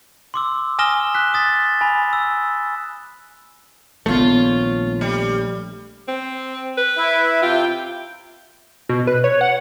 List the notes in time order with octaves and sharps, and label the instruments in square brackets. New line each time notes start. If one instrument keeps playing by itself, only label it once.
[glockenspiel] C6 D6 E6
G#5 D#6 F6 A#6 E7 G7
F#6 B6
D#6 A6 B6
G#5 B5
E6
[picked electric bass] A#1 A3 [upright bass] D#3 B3 [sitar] F4 C#5
[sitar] G3
[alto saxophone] C4
B4
[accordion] E4 E5
[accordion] C3 G5 [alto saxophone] F4
[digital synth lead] B2
B4
C#5
F#5